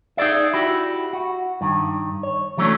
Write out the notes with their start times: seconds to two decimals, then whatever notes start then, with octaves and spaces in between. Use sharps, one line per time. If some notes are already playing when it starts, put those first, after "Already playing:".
0.17 D#4 G#4 A4 D5 E5
0.54 E4 F#4 G4
1.13 F#4
1.61 G2 D#3
2.23 C#5
2.57 E3 F#3 G3 A3 C#4 D4